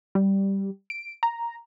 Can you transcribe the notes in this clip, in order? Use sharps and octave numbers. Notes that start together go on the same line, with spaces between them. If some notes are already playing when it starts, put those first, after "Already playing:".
G3
D7
A#5